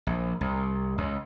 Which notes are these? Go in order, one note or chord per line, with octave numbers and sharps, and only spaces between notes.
A#1
C2
C#2